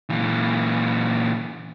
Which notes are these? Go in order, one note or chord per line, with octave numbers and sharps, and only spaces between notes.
A#2 E3